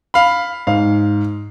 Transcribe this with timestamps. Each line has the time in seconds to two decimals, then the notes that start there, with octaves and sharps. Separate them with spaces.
0.14 F5 B5
0.67 G#2 F5